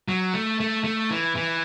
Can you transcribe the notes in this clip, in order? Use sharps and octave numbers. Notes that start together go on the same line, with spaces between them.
F#3
A3
A3
A3
E3
E3